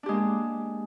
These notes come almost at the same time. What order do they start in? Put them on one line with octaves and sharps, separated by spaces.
D4 G4 G#3 A#3